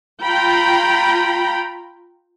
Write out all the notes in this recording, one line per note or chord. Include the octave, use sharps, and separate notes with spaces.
F4 G5 A#5 B5